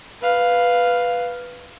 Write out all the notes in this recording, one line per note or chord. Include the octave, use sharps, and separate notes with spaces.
B4 F5